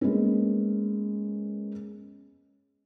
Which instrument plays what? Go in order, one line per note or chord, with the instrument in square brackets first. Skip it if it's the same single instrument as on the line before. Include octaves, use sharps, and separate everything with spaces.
[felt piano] G#3 A#3 B3 C#4